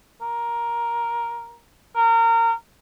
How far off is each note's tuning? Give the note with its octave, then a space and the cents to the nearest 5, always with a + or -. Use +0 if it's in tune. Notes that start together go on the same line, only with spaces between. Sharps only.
A#4 +10
A#4 -25